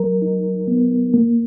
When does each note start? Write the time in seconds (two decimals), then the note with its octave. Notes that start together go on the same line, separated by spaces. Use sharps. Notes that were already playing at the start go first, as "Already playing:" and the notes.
Already playing: F#3 A#4
0.22 D#4
0.68 B3
1.14 A#3